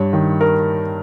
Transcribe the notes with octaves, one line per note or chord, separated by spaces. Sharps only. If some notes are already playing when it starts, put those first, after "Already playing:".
Already playing: G2 C#5
D#3
A#4